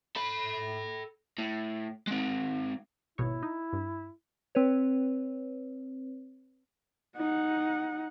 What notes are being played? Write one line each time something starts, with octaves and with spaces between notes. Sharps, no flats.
A4 B5
A2
G#3 C4
G#1 B2 E4 C#5
D#4
G2
C4 B4 C#5
D#4 F#5